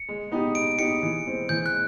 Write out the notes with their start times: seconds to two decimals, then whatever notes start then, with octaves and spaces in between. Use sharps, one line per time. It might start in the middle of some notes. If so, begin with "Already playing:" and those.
Already playing: C#7
0.09 G#3
0.32 B3 D#4 G4
0.55 G#3 D7
0.78 B3 D#4 G4 C#7
1.03 E3
1.26 G#3 C4
1.49 E3 G6
1.66 F#6
1.72 G#3